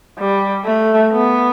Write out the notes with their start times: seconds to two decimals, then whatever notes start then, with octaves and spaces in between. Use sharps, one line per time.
0.19 G3
0.65 A3
1.12 B3